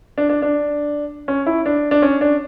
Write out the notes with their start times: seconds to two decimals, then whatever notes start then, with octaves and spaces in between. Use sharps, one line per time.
0.18 D4
0.30 D4
0.42 D4
1.28 C#4
1.46 E4
1.66 D4
1.91 D4
2.02 C#4
2.21 D4